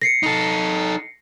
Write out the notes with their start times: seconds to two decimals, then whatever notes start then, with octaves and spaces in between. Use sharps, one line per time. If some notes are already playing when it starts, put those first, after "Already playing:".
0.02 A#6 C7 C#7
0.23 D#4 A4